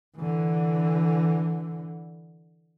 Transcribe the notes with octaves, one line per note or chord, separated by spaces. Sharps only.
D3 E3